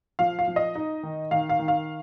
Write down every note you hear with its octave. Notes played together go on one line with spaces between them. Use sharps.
F3 F5
F5
F3
D#5
D#4
D#3
D#3 F5
F5
D#3
F5